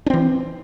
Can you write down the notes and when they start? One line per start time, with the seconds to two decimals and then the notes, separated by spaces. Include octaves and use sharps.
0.06 D4
0.10 C4
0.13 E3